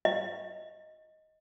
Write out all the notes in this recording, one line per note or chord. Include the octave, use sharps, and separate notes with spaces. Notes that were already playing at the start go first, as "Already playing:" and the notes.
D#5